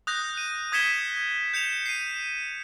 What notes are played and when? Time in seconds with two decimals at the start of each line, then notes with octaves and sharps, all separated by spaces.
0.07 D#6 F#6 G6 A#6
0.37 D#7
0.72 D#6 G#6 B6 C#7 E7 G7
1.54 G6 C#7 E7 F7
1.86 C7 D#7